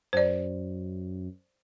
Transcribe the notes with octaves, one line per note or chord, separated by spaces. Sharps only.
F#2 C5 D5